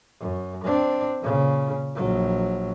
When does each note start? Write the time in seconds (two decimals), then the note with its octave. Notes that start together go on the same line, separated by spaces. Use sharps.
0.20 F#2
0.64 C4 D4
1.20 A#2 C#3
1.96 A#1 F#3